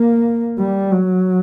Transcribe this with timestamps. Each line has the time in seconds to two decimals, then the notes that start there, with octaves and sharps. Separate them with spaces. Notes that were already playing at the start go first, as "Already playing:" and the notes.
Already playing: A#3
0.59 G3
0.92 F#3